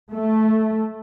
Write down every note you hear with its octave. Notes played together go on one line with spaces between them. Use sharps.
A3